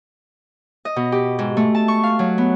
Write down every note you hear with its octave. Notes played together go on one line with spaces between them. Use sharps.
D#5
B2
G4
G#2
A3
A5
C#6
F5
F#3
B3